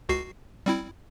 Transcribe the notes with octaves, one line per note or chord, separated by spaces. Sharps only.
C#2 F#4 C7
G3 C4 E4